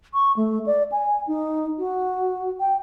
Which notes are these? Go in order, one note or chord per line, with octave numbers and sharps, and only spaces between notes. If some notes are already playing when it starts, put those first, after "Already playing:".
C#6
A3
D5
G#5
D#4
F#4
G5